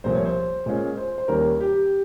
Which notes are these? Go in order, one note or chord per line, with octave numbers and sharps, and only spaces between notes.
C2 A#2 F3 C5
C#5
C5
A#2 G#3 C#4 F4
C5
C5
D#2 D#3 G3 A#3 C#4 A#4
G4